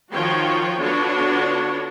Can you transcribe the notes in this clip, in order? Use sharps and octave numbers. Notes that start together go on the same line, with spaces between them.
D#3 F3 F4 F#4 C#5 G5
D3 B3 D4 F4 F#4 C#5